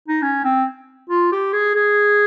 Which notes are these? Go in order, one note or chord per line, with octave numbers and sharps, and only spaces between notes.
D#4
C#4
C4
F4
G4
G#4
G#4